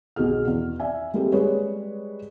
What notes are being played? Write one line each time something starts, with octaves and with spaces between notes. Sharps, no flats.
B1 B2 F#4 G#4 F6
E2
D5 E5 G#5
G3 G#3 A#3 C4 G4 A4
G3 G#3 G#4 B4 C#5